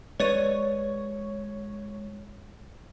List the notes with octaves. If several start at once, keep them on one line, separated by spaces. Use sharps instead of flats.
G#3 B4 C#5 D5 D#7